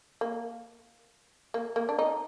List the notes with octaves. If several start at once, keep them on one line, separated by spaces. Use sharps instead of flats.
A#3
A#3
A#3
D4
D#4